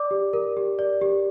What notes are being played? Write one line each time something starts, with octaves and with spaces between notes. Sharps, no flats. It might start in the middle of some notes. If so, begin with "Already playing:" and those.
Already playing: D5 D6
G4
A#4
G4
D5
G4